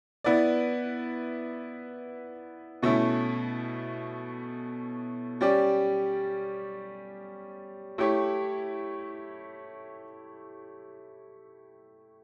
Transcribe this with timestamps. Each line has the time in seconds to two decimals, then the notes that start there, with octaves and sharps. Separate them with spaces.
0.24 B3 E4 B4 D5
2.83 B2 A3 C#4 E4
5.41 G3 C#4 G4 D5
7.98 A3 E4 G4 C#5